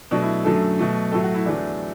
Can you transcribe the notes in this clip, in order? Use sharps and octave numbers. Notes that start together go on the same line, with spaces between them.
B2 F#3 A3 D4
E4
F#2 D3 F#3 A3 A4
B2 F#3 A3
A2 F#3 A3 A4
F#4
E4
E2 D3 F#3 A3 D4